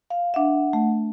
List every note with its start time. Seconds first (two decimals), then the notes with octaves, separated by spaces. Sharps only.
0.10 F5
0.34 D4 E5 F#5
0.73 A3